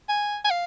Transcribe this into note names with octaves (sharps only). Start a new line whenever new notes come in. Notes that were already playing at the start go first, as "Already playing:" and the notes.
G#5
G#5
F5